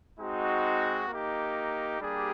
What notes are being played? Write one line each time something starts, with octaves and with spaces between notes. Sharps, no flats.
G#3 C4 D#4 F#4
A#3 D#4 G4
G3 A#3 D4 G4 G#4